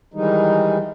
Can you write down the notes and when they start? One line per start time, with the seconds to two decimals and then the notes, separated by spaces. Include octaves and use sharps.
0.14 D#3 E3 G3 G#3 D#4